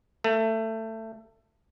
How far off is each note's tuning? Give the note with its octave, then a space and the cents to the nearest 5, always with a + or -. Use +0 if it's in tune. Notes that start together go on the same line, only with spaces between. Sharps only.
A3 +20